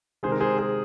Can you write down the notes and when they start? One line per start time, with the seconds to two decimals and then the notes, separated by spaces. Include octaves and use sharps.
0.23 C3 D#3 G#3 G#4 C5
0.32 A#4
0.41 G#4 C5
0.58 G#4 C5